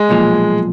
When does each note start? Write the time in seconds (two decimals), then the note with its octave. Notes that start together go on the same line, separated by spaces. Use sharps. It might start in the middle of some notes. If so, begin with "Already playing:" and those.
Already playing: G#3
0.09 B1 A#2 F3